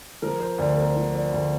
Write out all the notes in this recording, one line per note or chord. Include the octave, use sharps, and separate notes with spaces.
F3 A#4
C5
D2 D5
A#4
F3
D5
D2 D5